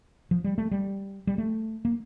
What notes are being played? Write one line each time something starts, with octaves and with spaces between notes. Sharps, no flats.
F3
G3
A3
G3
G3
A3
A#3